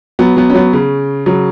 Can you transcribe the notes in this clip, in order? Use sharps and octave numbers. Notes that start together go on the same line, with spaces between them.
F#3 B3
F#3 B3
C#4
F#3 B3
C#3
C#3 F#3